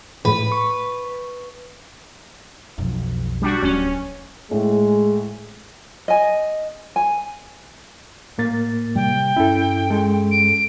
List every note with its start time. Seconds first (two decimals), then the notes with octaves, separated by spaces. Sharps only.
0.25 A2 B4
0.52 C#6
2.78 B1 F2
3.42 G3 D4 F#4
3.62 D1 C#4
4.51 A2 G#3
6.08 D#5 G#5
6.96 G#5
8.38 A2 A#3 A6
8.96 C3 G3 G5
9.37 G2 C#4 E4 A4
9.90 G#3 A4
10.31 D7